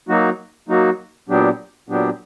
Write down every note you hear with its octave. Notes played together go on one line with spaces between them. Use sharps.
F#3 A#3 D#4 F#4
F#3 A#3 D#4 F#4
A#2 F#3 B3 D4 G4
A#2 F#3 B3 D4 G4